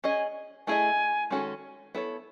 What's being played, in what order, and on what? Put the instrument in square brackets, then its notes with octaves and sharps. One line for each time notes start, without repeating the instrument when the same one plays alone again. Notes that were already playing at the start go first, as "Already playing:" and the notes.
[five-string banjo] C#4 G#4 D#5 [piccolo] G#5
[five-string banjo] A3 E4 G#4 D#5 [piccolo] G#5
[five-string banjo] D#3 G#3 C#4 F#4 A4
B3 E4 A4 C#5